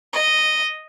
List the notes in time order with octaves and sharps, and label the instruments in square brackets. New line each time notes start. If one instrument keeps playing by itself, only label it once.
[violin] D#5